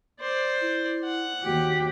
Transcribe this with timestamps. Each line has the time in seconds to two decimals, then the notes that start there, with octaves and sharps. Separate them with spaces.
0.20 C5 D5
0.62 E4
1.04 F#5
1.44 D#2 F#4 G4